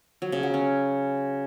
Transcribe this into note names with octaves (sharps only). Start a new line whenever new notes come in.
F#3
C#3
F#3
C#4